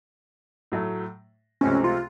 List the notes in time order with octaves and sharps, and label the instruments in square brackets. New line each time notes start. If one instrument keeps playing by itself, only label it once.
[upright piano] A2 F#3 A3
[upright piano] C#2 C3 F3 A3 C4 [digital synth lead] C#4
[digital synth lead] F4